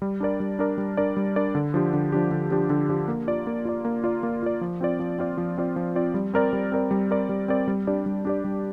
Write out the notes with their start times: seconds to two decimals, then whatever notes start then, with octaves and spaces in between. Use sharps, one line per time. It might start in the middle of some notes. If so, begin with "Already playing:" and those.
0.02 G3
0.20 D4 A#4 D5
0.40 G3
0.59 D4 A#4 D5
0.78 G3
0.97 D4 A#4 D5
1.17 G3
1.36 D4 A#4 D5
1.55 D3
1.74 F3 D4 G4
1.94 D3
2.12 F3 D4 G4
2.31 D3
2.51 F3 D4 G4
2.70 D3
2.89 F3 D4 G4
3.08 A#3
3.27 F4 D5
3.47 A#3
3.65 F4 D5
3.85 A#3
4.04 F4 D5
4.23 A#3
4.43 F4 D5
4.61 F3
4.81 C4 F4 D5
4.99 F3
5.19 C4 F4 D5
5.38 F3
5.58 C4 F4 D5
5.76 F3
5.95 C4 F4 D5
6.14 G3
6.34 C4 A#4 D5
6.53 G3
6.72 C4 A#4 D5
6.91 G3
7.10 C4 A#4 D5
7.29 G3
7.48 C4 A#4 D5
7.68 G3
7.87 D4 G4 D5
8.06 G3
8.25 D4 G4 D5
8.44 G3